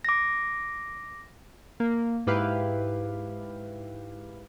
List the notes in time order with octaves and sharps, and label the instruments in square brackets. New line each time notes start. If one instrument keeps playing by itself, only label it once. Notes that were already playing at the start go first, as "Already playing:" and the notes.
[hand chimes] D6 A#6
[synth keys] A#3
G#2 E4 G4 B4 F5